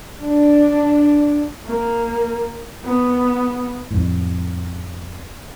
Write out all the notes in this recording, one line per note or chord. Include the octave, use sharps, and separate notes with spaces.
D4
A#3
B3
F2 A2